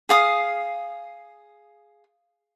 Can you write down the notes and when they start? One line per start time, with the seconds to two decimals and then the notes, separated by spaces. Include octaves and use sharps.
0.09 G#4 F5 D#6